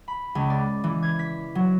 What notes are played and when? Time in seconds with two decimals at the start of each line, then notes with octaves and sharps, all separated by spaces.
0.08 B5
0.35 C#2
0.50 D5
0.84 E3
1.03 G#6
1.19 B6
1.55 F#3